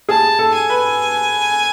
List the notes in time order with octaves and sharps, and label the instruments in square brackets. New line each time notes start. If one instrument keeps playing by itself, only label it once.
[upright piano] G#4 [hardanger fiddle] A5
[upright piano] A4
[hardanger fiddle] G#5
[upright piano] B4